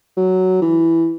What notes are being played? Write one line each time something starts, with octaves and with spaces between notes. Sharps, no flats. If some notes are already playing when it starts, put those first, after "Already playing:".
F#3
E3